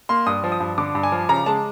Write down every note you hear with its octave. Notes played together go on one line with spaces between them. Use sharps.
A#3 C6
G2 D#6
F3
D#6
G2
D3 D6
G2
G#5
F3
C#3 A#5
G#3 A5